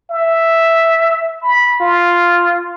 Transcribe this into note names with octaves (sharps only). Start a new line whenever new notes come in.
E5
B5
F4